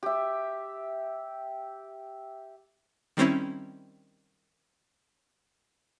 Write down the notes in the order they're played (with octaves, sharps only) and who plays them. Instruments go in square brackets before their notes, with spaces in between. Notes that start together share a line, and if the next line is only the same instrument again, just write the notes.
[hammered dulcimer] G4 E5
[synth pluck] D#3 G3 C4 C#4 E4